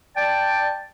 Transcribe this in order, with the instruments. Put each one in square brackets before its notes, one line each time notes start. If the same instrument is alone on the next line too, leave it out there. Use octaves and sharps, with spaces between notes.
[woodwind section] D5 G5 A5